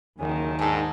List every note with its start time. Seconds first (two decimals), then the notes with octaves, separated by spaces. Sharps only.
0.19 F#1 D#2 D#3 G#5
0.59 G#2 D4 A4